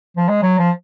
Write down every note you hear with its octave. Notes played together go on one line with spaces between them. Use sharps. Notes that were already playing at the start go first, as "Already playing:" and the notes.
F3
G#3
F#3
F3